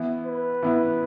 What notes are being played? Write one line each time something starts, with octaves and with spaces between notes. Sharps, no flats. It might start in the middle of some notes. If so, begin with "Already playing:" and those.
Already playing: E3 B3 E4
B4
E3 B3 E4